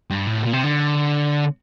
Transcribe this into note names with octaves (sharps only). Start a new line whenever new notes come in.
G2
A2
A#2
C3
D3